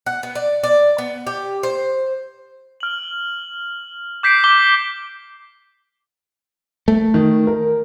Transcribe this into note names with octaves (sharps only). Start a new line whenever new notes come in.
F#5
B3
D5
D5
B3
G4
C5
F6 F#7
D6 G6 B6 C7 D7
D6 B6 G7
A3
D#3
A#4